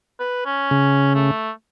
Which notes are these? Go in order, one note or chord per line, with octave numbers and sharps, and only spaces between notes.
B4
C#4
C#3
A3